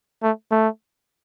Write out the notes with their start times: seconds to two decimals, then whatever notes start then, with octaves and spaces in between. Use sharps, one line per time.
0.22 A3
0.51 A3